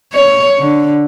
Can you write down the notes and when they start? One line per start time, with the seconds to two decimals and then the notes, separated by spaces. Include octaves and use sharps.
0.13 C#5
0.58 D3